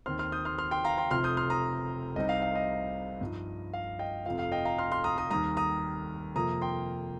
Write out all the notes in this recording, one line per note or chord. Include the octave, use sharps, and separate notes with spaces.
D#2 D#3 C4 C6 F6
C6 F6
D#6 G6
C6 F6
C6 F6
G5 C6
F5 A#5
G5 C6
F1 F2 C3 F3 C6 F6
D#6 G6
C6 F6
A#5 D#6
C2 C3 G3 C4 D#4 D#5
F5
F5
D#5
G2 F3 D#4
F5
D#5 G5
F1 F2 F3 F5
F5
D#5 G5
F5 A#5
C6 F6
C6 F6
A#5 D#6
A#5 D#6
D#2 D#3 G3 A#5 D#6
A#5 D#6
F2 C3 F3 A#3 A#5 D#6
G5 C6